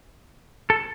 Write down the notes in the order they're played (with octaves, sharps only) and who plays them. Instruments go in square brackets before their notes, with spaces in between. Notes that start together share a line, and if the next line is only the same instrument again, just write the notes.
[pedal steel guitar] A4